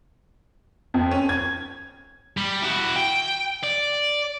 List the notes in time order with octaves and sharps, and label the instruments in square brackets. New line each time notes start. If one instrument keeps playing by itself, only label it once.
[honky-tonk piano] F2
C#4
G#6
[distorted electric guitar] G3
E4 F#4
G5
D5